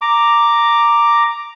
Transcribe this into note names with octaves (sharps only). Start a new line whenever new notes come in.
A#5 D6